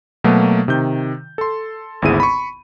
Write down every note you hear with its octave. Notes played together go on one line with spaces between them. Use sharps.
B2 F#3 A3 A#3
C3 D#3 G6
A4 C6
G#1 D2 B3 E4 G#4 D#7
B5 C#6